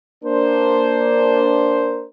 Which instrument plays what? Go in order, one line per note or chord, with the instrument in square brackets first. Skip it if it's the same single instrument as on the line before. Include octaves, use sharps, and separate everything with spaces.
[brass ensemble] A#3 D4 A#4 C5